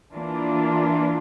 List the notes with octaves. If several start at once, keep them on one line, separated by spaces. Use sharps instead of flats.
E3 A#3 D4 F4